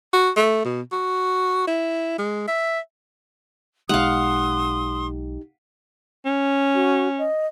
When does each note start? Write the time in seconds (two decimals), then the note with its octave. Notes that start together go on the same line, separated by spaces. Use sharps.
0.13 F#4
0.37 A3
0.65 B2
0.92 F#4
1.67 E4
2.18 G#3
2.48 E5
3.89 B1 G#3 D#4 G4 F5 F#5 C6 D#6
6.26 C#4
6.75 F#4
7.19 D#5